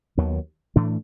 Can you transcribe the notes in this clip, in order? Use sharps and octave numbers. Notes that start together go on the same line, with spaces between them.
D#2 D#3 F#3 B3
A2 E3 A3 D4